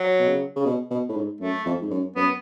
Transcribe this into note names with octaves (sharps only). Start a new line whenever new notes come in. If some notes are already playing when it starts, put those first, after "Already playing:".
Already playing: F#3
B2
C#3
C#3
B2
B2
A2
G#2
F#2 A3
F2
G#2
F#2
F#2 B3